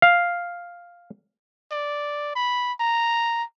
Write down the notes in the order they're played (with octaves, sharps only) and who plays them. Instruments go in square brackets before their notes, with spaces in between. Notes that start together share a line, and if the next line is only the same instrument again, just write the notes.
[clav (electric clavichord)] F5
[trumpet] D5
B5
A#5